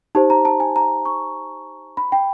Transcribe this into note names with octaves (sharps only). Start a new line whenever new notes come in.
D#4 G4 C5 A5
A#5
A5
G#5
A#5
C#6
B5
G5